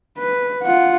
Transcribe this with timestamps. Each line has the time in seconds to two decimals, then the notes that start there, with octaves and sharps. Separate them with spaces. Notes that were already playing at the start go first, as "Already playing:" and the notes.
0.18 B4
0.63 F4 F#5